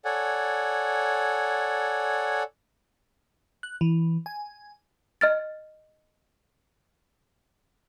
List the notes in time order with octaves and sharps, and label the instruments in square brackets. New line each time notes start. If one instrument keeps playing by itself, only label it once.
[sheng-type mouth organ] A4 C#5 D5 F#5 G#5
[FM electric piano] F#6
E3
G#5
[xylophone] D#5 F6 A6